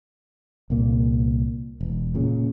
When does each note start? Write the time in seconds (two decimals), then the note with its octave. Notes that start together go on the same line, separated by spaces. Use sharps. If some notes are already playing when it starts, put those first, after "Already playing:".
0.70 C2 A#2 A#3
1.81 E1
2.15 A#2 C#3